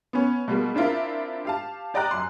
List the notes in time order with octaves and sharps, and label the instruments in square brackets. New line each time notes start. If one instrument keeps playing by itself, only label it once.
[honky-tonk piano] B3 C#4
B2 G3 G#3 A#3
C4 D4 E4 F4 A#4
G4 F5 A5
G4 D5 D#5 G5 A#5 F#6
F#2 C6